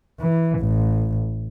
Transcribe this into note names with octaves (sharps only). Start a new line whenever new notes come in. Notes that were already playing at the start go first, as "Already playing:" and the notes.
E3
A1